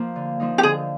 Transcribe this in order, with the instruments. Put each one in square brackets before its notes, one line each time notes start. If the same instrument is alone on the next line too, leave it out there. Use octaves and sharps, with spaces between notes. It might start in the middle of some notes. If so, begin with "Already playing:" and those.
Already playing: [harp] F3 A#3
D3
F3 A#3 D#4
[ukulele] G4
[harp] D3 [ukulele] G#4